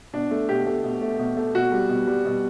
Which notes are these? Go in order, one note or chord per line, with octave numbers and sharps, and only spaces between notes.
B2 D4
A3
B2 G4
A3
B2
A3
B2
A3
B2 F#4
G3
B2
G3
B2